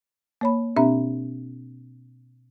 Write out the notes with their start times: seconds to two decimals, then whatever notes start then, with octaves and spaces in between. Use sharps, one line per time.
0.41 A#3 C#5 B5
0.76 B2 C4 D4 G4 E5 A#5